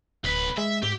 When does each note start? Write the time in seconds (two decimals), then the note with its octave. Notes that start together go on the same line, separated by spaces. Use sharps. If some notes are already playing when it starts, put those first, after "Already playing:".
0.24 D1 B1 B4
0.58 G#3 E5
0.83 G#2 G4